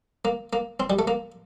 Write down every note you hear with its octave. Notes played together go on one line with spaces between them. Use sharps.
A#3
A#3
C4
G3
A3
A#3